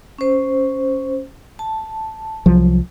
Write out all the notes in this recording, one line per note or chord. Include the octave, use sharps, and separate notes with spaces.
C#4 C5
A5
C2 F3 F#3